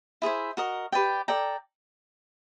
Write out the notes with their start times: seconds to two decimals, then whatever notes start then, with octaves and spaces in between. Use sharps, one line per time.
0.22 E4 G#4 C5 E5
0.57 F#4 A#4 D#5
0.92 G4 B4 D5 G5
1.28 A4 D5 G5 A#5